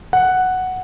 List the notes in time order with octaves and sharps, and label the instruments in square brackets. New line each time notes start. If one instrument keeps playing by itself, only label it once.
[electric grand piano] F#5